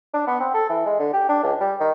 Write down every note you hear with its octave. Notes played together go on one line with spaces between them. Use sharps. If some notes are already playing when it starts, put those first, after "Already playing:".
D4
B3
C4
A4
E3
G#3
D3
G4
D4
C#2
G3
D#3